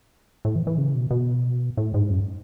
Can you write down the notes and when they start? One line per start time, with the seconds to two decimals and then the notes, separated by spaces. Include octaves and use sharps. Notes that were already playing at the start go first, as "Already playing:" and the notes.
0.45 A2
0.56 E3
0.67 E3
0.78 C#3
0.95 B2
1.11 B2
1.77 A2
1.94 G#2
2.10 F#2